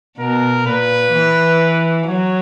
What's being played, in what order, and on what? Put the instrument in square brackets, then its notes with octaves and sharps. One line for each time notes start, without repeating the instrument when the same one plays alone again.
[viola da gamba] B2 [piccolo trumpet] A#4
[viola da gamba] A#2 [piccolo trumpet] B4
[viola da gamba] E3
[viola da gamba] F#3 [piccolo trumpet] C#5